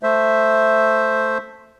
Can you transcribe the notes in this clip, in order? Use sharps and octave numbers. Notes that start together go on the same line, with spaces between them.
A3 C5 E5